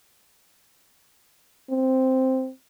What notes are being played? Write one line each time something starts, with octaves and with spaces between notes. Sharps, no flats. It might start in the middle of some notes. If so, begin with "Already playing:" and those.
C4